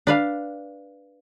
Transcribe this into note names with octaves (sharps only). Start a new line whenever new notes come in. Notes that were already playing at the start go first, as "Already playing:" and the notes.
D4 B4 F5